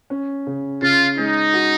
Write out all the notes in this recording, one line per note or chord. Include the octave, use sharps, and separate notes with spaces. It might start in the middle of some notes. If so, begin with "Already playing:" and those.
C#4
C#3
C#3 F4
G#3 D#4
F#4